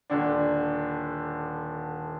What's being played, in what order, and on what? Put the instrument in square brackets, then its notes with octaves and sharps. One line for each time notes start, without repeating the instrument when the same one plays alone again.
[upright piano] D#1 D3 D4